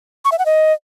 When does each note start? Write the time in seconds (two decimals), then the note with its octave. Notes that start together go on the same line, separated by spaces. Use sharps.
0.25 C#6
0.32 E5
0.39 F#5
0.46 D#5